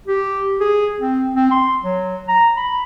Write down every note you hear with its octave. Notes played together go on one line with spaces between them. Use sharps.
G4
G#4
C4
C4
C6
F#3
A#5
B5